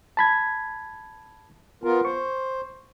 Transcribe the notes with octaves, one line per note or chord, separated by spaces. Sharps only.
A5 B5 G#6
B3 F4 A#4
C5 C#6